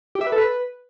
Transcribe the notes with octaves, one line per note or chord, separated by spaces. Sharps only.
G4
E5
B4
A4
B4